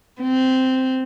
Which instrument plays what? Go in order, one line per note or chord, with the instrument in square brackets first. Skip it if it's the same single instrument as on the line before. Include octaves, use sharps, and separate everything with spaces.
[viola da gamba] C4